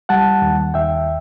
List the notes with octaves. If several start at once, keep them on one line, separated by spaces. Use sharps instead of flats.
G3 F#5 A5
D#2
D#2 E5 G5